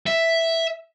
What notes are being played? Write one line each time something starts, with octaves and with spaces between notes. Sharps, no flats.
E5